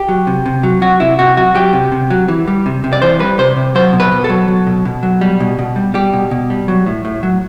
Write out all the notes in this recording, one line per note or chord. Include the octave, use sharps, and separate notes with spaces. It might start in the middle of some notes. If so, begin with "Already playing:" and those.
Already playing: G4
F#3
C3
C3
F#3
F#3 F#4
C3 E4
C3 F#4
F#3 F#4
F#3 G4
C3
C3
F#3
E3
G3
C3
C3
D5
E3 C5
G3 B4
C3 C5
C3
F#3 C5
B2
B4
B2
A4
F#3
F#3
B2
B2
F#3
G3
B2
B2
G3
G3 G4
B2
B2
G3
F#3
A2
A2
F#3